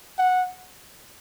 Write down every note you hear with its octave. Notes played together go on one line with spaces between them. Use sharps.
F#5